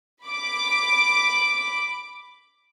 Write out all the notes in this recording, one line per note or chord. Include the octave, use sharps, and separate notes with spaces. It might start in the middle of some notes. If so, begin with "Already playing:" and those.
B5 D6